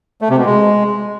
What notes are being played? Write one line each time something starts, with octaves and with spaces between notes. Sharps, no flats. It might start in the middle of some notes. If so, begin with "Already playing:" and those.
A3
C3
B2
G#3